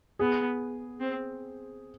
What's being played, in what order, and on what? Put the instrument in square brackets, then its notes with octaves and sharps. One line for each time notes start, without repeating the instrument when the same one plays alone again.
[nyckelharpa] B3 [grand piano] G#4
[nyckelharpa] C4